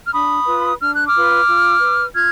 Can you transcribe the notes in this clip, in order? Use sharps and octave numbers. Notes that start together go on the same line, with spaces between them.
F6
D4 B5 D#6
F4 B4
D4 F6
F#6
D6 F6
F4 B4
F4
B4
F4 F6 G#6